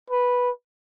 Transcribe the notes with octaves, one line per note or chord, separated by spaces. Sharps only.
B4